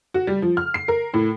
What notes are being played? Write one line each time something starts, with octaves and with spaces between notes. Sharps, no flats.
F#4
G3
F3
F6
C7
A#4
A2